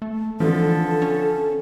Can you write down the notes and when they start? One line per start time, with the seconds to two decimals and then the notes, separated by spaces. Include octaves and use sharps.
0.02 A3
0.40 D3 E3 F3 A4
1.02 C#4